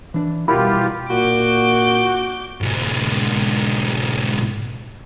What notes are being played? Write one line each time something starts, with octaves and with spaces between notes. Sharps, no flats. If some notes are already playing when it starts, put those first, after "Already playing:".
E3 D4
B2 G3 E4 F4 G4 A#4 F#5 B5
A#2 F#4 D6 G6
G#2 B2